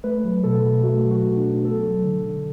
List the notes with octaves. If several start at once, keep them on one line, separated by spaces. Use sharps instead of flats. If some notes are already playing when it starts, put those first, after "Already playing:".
A3 B4
F#3
B2 A4
B2
A3 F#4
F#3
F#4
B2
D4
B2
B3 A4
F#3
D3
D3